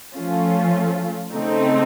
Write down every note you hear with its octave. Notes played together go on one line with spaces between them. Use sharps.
F3 A3 C#4 F4
C#3 A3 C4 D#4